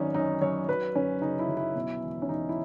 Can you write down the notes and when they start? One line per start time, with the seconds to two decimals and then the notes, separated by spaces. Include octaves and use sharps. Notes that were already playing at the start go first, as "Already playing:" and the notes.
Already playing: G#1 F#2 C#4 D#4
0.14 F#2 D#4
0.41 F#2 C#5
0.68 F#3 B4
0.96 F#2 C#4
1.22 C#3 D#4
1.39 E4
1.49 F#2
1.57 E4
1.75 B2
2.03 E1
2.22 C#4
2.29 E2 D#4
2.49 E4